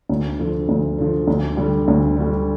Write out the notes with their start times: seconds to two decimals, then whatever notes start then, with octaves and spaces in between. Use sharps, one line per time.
0.09 D2
0.39 D3 F3
0.69 D2
0.98 D3 F3
1.28 D2
1.57 D3 G3
1.88 D2
2.17 D3 G3